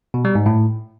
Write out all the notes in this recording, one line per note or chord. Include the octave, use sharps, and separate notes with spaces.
B2
G3
G#2
A2